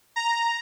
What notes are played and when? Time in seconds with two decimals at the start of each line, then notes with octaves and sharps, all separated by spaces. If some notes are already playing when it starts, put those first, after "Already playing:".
0.16 A#5